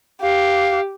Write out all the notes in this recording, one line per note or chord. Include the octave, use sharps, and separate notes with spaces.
G4 F5